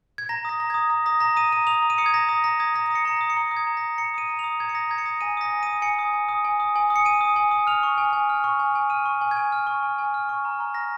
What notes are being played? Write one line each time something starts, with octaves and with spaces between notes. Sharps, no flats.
G#6
A#5 A#6
D#6 A#6
A#5
D#6 G#6
A#5 A#6
D#6 A#6
A#5 A#6
D#6 D#7
A#5 D#7
D#6 F7
A#5
D#7
D#6 C#7
G#6
A#5 A#6
D#6 A#6
A#5 A#6
D#6 G#6
A#5 A#6
A#6
D#6 C#7
A#5 C#7
D#6 A#6
C#7
A#5 A#6
D#6
G#6
A#5
A#6
D#6
A#5 C#7
D#6 D#7
A#5
F7
D#6
A#5 G#6
C#7
D#6 A#6
A#5 G#6
C#7
D#6 A#6
G#5 D#7
D#6 A#6
G#5
D#6 D#7
G#5 C#7
D#6
G#5
D#6
G#5
D#6
G#5
D#6
C#7
G#5 D#7
D#6
G#5
D#6
F6 F7
C#6
G#5
G#5
F6
C#6
G#5
G#5
F6 D#7
C#6
G#5
G#6
G#5
F6
C#6
G#5
G#5
F6
C#6
A#5
A#5
F6 A#6